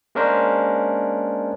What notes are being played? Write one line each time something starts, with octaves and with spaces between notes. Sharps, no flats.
G#3 A#3 C#4 D4 A#4 C5